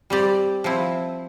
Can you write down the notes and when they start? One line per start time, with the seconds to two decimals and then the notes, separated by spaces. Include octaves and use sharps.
0.10 G3 C4 G4 D5
0.64 F3 C4 E4